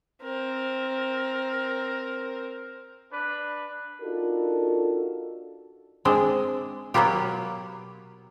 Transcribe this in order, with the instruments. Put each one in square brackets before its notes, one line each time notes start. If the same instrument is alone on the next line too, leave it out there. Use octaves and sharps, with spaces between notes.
[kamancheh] C4 A#4
[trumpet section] D4 B4
[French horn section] D4 D#4 F4 F#4 A4 A#4
[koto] G#3 C4 D4 D#5
B2 F#3 A#3 B3 F4 G4